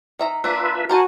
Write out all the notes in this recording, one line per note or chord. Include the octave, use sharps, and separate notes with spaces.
D#3 E5 A#5
A#3 D4 F4 B4 E5
F#4 A#4 C5 G#5 A5